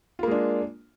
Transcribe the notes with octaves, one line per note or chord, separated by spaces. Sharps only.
G#3 A#3 D4 F4